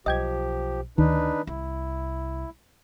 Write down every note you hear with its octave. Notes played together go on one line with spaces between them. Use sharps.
B1 F3 G4 D#5 G5 G#6
D2 D#3 D4 D#4 B4
C2 E4